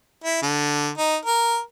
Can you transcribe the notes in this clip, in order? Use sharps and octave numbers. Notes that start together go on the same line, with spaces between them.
E4
D3
D#4
A#4